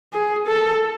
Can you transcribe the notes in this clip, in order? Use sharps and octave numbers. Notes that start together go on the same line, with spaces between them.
G#4
A4